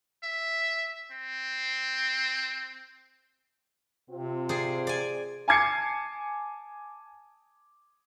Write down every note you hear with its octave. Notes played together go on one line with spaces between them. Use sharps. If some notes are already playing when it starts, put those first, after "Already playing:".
E5
C4
C3 C4 F4
G#4 C5 D5
D5 G#5
G#5 A5 D6 G#6 C7 C#7